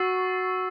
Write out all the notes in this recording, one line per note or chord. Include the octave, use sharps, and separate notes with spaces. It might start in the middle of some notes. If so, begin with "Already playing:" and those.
Already playing: F#4 C#6 E6 A6 C7